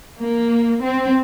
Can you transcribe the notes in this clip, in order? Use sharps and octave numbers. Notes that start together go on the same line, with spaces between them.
A#3
C4